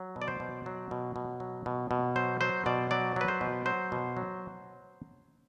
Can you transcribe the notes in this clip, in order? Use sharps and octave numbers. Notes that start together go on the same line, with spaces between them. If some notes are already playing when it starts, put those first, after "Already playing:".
Already playing: F#3
B2
D5
C5
B2
F#3
B2
B2
F#3
B2
B2
F#3 C5
F#3 C5
B2 D5
F#3 D5
F#3 B4
C5
B2
F#3 C5
B2
F#3